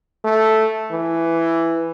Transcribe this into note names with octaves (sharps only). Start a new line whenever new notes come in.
A3
E3